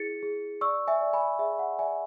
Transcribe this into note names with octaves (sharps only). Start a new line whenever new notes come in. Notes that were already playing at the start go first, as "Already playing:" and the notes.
Already playing: E4 G#4 A6 C#7
G#4
D5 C#6 E6
E5 G#5
D5
G#5 B5
G#4 E5
F#5
D5 E5 G#5